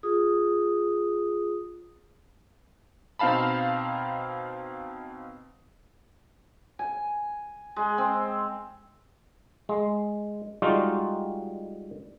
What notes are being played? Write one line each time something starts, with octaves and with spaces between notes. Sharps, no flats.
F4 G#4 D#6
B2 C4 D#4 F5 A5 B5
G#5
G#3
C4
G#3
G3 G#3 D#4 F4 F#4